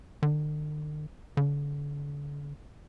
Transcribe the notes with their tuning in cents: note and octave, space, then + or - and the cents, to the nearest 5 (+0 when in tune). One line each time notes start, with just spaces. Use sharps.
D3 +45
D3 -35